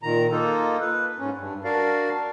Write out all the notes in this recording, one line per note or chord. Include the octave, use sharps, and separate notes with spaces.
A#2 D#3 A#5
A#3 D#4 F4 A4
B4
G#2 C#4
G2
D4 F#4 A#4 D5 F5